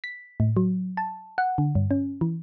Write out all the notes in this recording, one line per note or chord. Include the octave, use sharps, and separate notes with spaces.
B6
A2
F#3
A5
F#5
D3
G2
C#4
E3